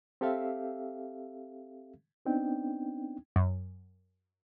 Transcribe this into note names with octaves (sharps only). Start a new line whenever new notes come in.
C4 G4 A4 E5 F5
B3 C4 D4 D#4 G5
F#2